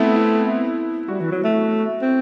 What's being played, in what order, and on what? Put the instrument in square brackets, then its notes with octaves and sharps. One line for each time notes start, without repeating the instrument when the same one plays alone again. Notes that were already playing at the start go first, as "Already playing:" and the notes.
Already playing: [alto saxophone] A3 [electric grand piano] B3 C4 E4
[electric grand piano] E4
[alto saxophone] G3 [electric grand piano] F#4
[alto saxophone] E3
F#3
A3
C4